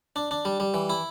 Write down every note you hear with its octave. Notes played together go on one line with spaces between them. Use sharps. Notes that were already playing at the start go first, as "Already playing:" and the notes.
D4
D4
G3
G3
E3
E4